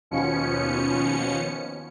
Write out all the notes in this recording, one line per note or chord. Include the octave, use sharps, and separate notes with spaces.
D#2 B2 F3 C#4 C#7